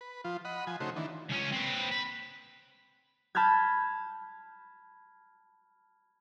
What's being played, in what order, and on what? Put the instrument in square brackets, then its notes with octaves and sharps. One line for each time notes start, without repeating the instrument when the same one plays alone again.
[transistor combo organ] B4
F3 F4
D#5 F#5 B5
F3 G#5
C#3 A3 D#4 F#4 C5
D#3 E3 D4
[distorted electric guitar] C#2 C#4
C4 B4
B4
[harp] A5 B5 F6 G6 G#6